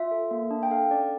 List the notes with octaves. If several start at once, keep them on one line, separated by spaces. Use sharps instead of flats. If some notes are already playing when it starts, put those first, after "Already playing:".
Already playing: F4 E5
A4
A#3
D4
G5
A4 F5
C#4 D5